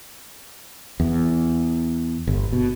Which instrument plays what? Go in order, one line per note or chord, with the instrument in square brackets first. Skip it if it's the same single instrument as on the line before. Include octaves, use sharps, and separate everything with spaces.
[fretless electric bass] E2
G1
B2